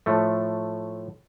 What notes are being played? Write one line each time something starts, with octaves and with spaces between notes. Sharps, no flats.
A2 F3 A3